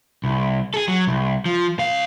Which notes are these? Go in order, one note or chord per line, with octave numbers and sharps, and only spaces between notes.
C2
G#4 A4
F#3
C2
F3
C#2 F5